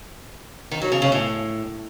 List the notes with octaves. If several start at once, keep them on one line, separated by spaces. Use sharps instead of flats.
D#3
F#3
C#3
C#3
A2